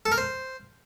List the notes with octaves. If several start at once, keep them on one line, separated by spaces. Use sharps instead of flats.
A4
A#4
C5